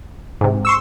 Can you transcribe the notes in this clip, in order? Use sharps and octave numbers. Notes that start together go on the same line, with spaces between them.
G#2 C3
C6 C#6 E6